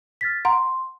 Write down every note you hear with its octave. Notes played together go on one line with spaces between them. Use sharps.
F6 A6 B6
F#5 A#5 C6